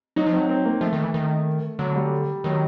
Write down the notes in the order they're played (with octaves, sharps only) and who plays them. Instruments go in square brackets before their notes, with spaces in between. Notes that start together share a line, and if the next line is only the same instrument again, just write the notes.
[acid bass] F#3 [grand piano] D#4
[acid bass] F3
[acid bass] F#3 [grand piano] C4
[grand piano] C4
A#3
[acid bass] F3 [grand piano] A3
[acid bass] D#3
E3
D#3
[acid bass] D3 [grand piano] F#3
[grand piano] G3
[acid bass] D#3 [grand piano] F#3